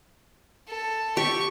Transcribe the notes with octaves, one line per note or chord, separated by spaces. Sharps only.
A4
G4 C#6